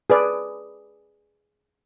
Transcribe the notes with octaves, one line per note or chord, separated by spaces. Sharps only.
G#4 B4 D5